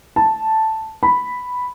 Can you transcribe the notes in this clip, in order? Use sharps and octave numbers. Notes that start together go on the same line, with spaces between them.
A5
B5